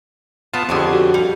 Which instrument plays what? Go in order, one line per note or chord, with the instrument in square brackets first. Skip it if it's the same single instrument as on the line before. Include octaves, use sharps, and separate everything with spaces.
[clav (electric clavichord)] B3 F4 [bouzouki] A5
[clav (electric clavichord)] F2 D3 [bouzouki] C#4 G4 G#4
[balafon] F#4
[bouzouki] G3